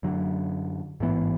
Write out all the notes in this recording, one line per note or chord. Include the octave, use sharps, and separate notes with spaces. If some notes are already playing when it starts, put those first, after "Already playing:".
F#2 D3 F#3
A1 G#2 E3 B3